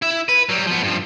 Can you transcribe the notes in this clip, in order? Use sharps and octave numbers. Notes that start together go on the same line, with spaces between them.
E4 E5
B4
F#3 G3
F3 B3
G2 F3